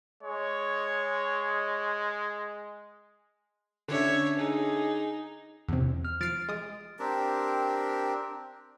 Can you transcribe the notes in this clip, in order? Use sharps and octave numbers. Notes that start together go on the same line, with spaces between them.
G#3 C#5
D3 C#4 D4 C#5 E5
D#4 G#4
E2 C3
F6
F3 F6 A6 C7 D7
G#3 D#6
C4 D4 G4 A#4